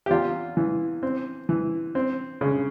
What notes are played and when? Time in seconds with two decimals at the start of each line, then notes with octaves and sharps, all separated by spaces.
0.06 G4
0.10 E2 F4
0.57 E3
1.03 C4
1.49 E3
1.95 C4
2.41 C#3